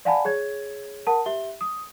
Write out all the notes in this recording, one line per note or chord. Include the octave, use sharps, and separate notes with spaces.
D5 F5 F#5 G#5 A5 B5
G#4 C#5 G#6
A#4 F#5 A5
G4 E5 G7
D#6